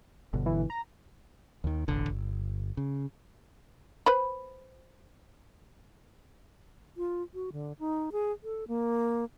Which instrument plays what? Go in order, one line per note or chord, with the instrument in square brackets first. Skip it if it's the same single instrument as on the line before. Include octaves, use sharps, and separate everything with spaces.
[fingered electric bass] G1 B2 D3
[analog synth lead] E3
A#5
[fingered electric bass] D#2 D#3
E1 A1 D3
G1
C#3
[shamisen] B4 C5 B5
[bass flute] F4
F#4
D3
D#4
G#4
A4
A#3